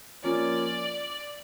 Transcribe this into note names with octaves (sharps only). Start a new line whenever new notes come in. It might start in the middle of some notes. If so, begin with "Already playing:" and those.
F3 A#3 C#4 F4 D5